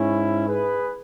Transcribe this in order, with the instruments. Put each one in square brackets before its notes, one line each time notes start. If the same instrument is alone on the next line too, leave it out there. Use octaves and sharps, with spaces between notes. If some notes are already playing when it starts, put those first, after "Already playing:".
Already playing: [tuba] G#2 [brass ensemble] C#4 E4
[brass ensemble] G#4 B4